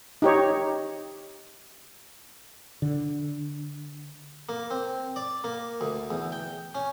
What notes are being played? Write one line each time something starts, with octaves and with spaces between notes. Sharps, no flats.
D#4 G4 C#5
D3
A#3
C4
D5
A#3
D2
E2
G5
C#4